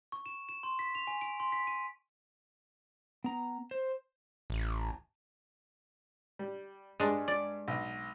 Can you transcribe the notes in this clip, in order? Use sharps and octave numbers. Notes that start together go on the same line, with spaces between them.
C#6
E7
E7
C6
B6
F7
G#5
D7
C6
B6
D#7
B3 A#5
C5
A1
G3
G2 G#3 D4
D5
B1